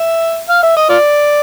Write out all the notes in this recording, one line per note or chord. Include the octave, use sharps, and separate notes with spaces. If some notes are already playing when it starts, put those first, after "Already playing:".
Already playing: E5
F5
E5
D#5
F4 D5